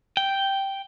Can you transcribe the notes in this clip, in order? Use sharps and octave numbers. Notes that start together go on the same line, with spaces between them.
G5